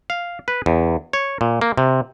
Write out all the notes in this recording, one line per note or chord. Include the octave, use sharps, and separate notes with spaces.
F5
B4
E2
C#5
A#2
A#3
C3